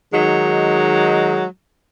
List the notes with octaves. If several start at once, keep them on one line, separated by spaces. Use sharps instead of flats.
D#3 F#3 G#3 D#4